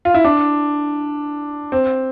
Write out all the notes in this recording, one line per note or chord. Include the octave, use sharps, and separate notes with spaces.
F4
E4
D4
C4